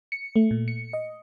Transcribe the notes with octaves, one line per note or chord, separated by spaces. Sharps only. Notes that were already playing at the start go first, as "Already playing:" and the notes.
C#7
A3
A#2
C#7
D#5